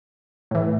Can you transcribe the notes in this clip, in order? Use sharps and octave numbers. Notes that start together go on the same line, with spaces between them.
A2 E3